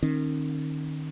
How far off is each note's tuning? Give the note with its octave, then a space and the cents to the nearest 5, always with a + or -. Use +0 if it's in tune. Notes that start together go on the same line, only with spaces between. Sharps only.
D#3 -25 C4 +40